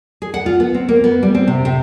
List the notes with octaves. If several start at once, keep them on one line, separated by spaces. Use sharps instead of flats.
G#4
F#5
F4
B3
C4
A#3
B3
G3
C4
C3
C3